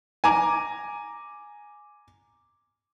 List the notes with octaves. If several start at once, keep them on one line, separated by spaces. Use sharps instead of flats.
G#5 A#5 D6